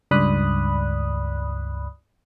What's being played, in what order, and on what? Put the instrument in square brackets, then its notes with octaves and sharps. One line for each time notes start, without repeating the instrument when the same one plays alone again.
[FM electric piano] C#2 G2 D5 B5 D#6 F#6